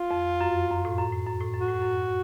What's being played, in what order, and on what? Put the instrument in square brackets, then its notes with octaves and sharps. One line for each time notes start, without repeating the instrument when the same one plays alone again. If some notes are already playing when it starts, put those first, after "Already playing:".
Already playing: [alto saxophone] F4
[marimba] F2
F#2
F#2
A2
F#2
A2
F#2
A2
F#2
[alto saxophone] F#4
[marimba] A2
F#2
A2